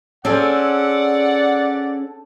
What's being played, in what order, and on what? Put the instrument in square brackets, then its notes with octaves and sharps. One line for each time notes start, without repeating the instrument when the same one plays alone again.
[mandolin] C4 A4 [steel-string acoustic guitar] C#4 G#4 [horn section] D5 F#5